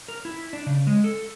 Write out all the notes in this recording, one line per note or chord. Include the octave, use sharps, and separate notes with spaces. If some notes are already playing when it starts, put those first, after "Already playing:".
A#4
E4
D4
C#3
G#3
A4